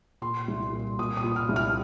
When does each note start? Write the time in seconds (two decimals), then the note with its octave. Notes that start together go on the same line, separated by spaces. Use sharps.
0.22 A#2 C6
0.48 C2
0.72 A#2
0.99 A#2 D#6
1.17 D#6
1.24 A#2
1.36 F6
1.49 C2
1.56 F6